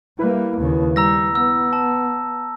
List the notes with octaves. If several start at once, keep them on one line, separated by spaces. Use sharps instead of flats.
G3 A#3 E4 B4
D#2 C#3
G3 A#5 E6 A#6
B3 E6
A5